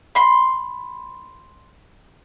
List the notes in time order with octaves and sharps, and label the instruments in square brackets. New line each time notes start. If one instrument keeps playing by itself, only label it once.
[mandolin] B5 C6